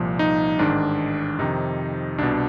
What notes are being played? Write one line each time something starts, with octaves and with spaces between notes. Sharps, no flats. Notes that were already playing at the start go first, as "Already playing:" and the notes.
Already playing: C2 A#2 F3
D#4
A1 G#2 D#3 D4
F2 C3 D#3 D#4
C2 B2 D4